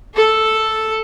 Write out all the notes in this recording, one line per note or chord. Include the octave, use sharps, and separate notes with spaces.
A4